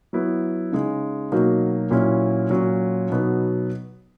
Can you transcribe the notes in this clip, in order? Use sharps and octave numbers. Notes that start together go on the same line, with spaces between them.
F#3 B3 E4
C#3 G#3 D#4
B2 F#3 A#3 D#4
A#2 F#3 C#4 E4
A#2 F#3 C#4
B2 F#3 B3 D#4